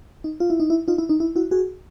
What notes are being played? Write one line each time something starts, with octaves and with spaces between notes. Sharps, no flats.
D#4
F4
E4
D#4
E4
D#4 F4
E4
D#4
E4
E4 F#4
F#4 G#4